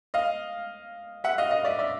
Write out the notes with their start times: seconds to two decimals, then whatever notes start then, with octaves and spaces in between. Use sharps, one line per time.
0.14 D#5 F5
1.24 E5 F#5
1.38 D#5 F5
1.51 D#5 F5
1.64 D5 E5
1.79 D5 E5